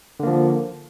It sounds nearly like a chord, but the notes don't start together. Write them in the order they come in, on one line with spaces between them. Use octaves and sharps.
D3 A#3 F3